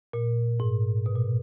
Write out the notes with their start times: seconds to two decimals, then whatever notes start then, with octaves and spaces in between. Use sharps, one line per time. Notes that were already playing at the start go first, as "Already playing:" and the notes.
0.13 A#2
0.60 G#2
1.06 B2
1.16 A#2